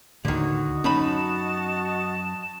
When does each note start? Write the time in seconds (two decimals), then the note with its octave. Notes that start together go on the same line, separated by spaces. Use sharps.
0.25 D2 A2 D3 D#3 F#4 D#5
0.84 F#2 C#4 D#4 A5 B5